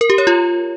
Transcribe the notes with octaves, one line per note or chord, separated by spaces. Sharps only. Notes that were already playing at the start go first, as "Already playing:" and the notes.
A#4
G4
C#5
F4